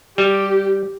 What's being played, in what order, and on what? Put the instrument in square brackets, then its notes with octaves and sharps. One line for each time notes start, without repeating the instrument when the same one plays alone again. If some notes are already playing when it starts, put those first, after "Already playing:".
[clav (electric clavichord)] G3 [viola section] G4